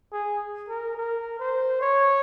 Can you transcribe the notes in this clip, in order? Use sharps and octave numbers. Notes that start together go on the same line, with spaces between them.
G#4
A#4
A#4
C5
C#5